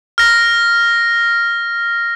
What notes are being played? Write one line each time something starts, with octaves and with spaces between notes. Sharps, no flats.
F6 A#6